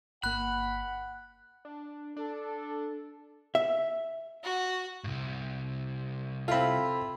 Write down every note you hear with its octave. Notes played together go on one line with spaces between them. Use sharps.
G1 A#3 F#5 B5 F#6
D4
D4 A4
E5
F#4
C2 G2
C4 E4 F4 A4 B5